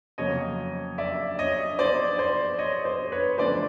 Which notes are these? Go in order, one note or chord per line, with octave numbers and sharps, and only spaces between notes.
F2 C#3 F#3 A#3 C#5 D#5
D5 E5
C#5 D#5
C5 D5
C5 D5
C#5 D#5
C5 D5
B4 C#5
F#2 D3 F3 A3 C5 D5